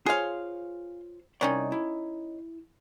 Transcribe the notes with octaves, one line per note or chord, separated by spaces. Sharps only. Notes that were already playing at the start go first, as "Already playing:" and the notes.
F4 G#4 C5 C#5 F5
C2 D#3 C#4 D#4 D5
E4